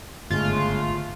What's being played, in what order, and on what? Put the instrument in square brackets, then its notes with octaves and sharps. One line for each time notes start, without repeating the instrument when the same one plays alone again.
[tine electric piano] G1 [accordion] C#3 G#3 [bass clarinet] A3 [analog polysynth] F4